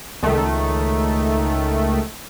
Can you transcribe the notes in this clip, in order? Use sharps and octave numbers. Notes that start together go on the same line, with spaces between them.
C#2 D#3 A3